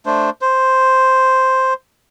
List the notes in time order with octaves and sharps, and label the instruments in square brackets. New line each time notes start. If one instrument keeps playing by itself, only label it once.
[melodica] A3 D4 C5
C5